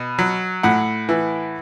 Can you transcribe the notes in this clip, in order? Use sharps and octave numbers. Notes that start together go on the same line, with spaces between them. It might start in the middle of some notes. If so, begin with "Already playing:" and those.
Already playing: B2
F#3
A2 F#5
E3